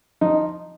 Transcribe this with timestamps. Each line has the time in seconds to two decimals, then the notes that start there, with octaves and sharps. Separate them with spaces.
0.21 F3 D#4